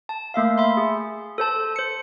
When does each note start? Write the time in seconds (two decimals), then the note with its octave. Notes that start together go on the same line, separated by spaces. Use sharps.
0.09 A5
0.34 A3 A#3 E5 F5
0.58 E5 B5 C6
0.77 G#4
1.38 A4 C5 A5
1.76 C5 C#7